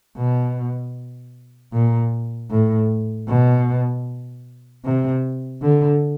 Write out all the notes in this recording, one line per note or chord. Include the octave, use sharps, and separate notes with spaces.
B2
A#2
A2
B2
C3
D3